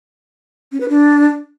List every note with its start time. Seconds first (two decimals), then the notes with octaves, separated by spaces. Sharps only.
0.72 C#4
0.81 B4
0.89 D4